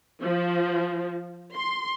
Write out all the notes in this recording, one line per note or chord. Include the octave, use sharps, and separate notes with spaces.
F3
C6